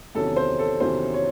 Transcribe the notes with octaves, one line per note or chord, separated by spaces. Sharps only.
E2 C3 D#3 F#3 C#4 A4
C5
A4
E2 C3 D#3 F#3 C#4 C5
C#5